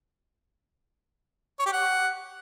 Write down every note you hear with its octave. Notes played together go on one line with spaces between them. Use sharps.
C#5
G4
F#5